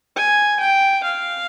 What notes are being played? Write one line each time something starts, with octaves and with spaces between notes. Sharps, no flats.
G#5
G5
F5